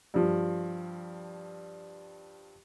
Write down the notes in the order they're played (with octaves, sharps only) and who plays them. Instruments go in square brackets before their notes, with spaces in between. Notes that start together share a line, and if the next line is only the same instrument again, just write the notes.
[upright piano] G2 F3